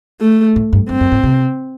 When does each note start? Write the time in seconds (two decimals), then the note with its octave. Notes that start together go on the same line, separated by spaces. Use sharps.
0.21 A3
0.56 A2
0.73 G2
0.89 G2 C4
1.00 F#2
1.12 A2
1.23 C3